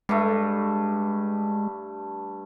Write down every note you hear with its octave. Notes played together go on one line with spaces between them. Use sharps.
G2 G#3 A3